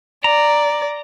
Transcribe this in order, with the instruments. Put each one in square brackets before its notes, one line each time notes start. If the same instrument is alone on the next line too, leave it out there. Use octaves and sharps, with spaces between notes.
[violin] D5 [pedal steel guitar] A#5